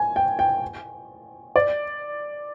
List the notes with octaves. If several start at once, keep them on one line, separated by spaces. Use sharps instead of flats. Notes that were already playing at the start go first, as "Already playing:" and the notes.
Already playing: G#5
G5
G5
D5